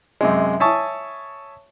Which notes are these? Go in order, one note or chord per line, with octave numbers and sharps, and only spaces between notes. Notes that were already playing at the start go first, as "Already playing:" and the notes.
F#2 C3 G#3
C#5 E5 G#5 A5 C#6 D#6